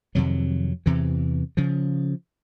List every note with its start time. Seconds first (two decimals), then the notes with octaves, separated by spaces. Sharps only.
0.15 F2 C3 D#3 F#3
0.86 E2 C3 E3
1.57 C#3 F3